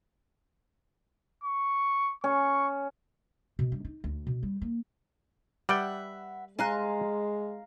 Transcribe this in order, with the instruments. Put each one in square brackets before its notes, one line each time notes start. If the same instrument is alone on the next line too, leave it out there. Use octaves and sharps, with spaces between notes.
[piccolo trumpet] C#6
[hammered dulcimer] C#4 [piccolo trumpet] C#6
[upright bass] B2
G2
D#4
D2
B2
G3
A#3
[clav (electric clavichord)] G3 D5 G5 [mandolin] B4 E5 F#5
[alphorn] G#3 [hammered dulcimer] F5 A#5 [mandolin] G#5 C6 F#6